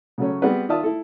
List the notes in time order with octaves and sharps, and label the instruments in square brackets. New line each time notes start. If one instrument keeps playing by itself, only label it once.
[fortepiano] C#3 F#3 A3 C#4
G3 B3 C4 F#4 G#4 B4
D#3 F4 D5 E5 A5 D#6
E4 A4